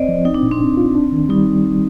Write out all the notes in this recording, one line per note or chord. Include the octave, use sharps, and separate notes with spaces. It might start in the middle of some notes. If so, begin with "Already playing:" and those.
Already playing: C4 C5 D5 D#5
F3
C4 D#4
D4
A#2
C4
D4
F4
D4
D#3
G3 D#4